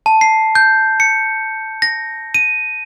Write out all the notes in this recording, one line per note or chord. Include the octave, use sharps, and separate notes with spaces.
A5
C7
G6
C#7
A#6
D#7